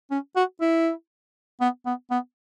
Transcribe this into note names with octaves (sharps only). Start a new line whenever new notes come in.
C#4
F#4
E4
B3
B3
B3